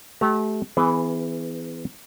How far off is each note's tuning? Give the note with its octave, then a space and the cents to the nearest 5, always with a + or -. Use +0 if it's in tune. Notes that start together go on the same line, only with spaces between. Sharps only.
A3 -30 G4 -30 A#5 +0
E3 +0 B3 +30 G#4 +0